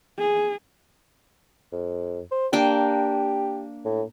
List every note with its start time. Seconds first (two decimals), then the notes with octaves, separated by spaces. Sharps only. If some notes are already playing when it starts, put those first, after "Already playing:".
0.18 G#4
1.73 F2
2.31 C5
2.53 A#3 D4 G4 G5
3.85 A2